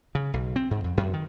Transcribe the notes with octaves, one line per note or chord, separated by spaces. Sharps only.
C#3
B1
C4
G#2
F2
F#2
D#3